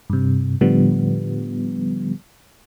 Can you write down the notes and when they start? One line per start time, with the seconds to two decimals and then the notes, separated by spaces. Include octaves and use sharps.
0.10 G2 C3
0.61 A2 D3 F3 G3 B3